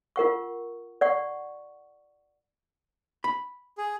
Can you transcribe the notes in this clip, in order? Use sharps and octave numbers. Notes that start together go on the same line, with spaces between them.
F4 A#4 F#5 C#6
D5 F#5 C#6
B5
G#4